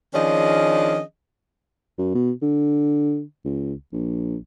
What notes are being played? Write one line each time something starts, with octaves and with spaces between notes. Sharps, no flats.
D#3 F3 C#4 D4 G#4 D#5
F#2
B2
D3
C#2
A#1